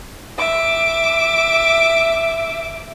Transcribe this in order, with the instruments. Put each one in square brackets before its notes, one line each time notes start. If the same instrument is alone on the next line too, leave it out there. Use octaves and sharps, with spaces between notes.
[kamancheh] E5 D6